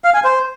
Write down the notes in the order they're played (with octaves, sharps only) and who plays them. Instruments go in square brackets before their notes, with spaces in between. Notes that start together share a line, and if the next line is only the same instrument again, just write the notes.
[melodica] F5
G#5
C5